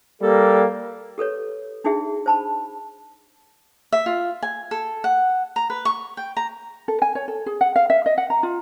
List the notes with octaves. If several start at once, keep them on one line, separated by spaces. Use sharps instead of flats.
G3 A#3 A4
G4 A4 B4 C#5
D4 D#4 F#4 G#4 E5
C5 A5 B5
E5
F4
G#5
A4
F#5
A#5
B4
C#6
G5
A#5
A4
G#5
C#5
A4
G#4
F#5
F5
E5
D#5
F#5
A#5
F4